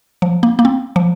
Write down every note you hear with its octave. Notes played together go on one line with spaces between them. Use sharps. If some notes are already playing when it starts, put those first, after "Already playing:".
F3
A#3
A#3
C4
F3